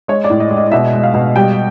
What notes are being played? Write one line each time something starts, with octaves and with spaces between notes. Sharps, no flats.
G#3 C#5
D5
A2
D#5
G#3
D#5
B2 E5
G#3
F5
B2
G3 G5